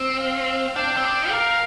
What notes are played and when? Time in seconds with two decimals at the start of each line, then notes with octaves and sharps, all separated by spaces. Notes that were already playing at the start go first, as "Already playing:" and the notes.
Already playing: C4
0.21 F5
0.76 D4 G5
0.97 C4
1.04 D4
1.31 A#4 F5